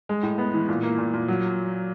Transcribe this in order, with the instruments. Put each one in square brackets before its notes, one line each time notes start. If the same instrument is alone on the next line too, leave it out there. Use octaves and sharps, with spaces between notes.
[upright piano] G#3
A2
B3
E3
A#2
A#3
A#2
A#2
F#3